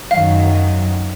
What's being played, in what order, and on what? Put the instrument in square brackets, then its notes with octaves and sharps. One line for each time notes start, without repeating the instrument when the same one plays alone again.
[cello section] F#2 D#3 F#3 [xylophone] F5